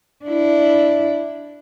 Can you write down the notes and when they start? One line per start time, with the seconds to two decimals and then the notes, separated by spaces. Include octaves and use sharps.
0.25 D4 E4